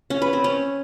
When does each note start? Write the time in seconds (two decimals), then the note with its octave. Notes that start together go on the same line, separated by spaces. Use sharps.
0.10 C#4
0.22 B4
0.33 C4
0.44 C#4